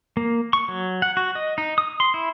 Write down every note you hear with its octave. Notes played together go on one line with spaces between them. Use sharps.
A#3
C#6
F#3
F#5
F#4
D#5
D#4
D#6
C6
E4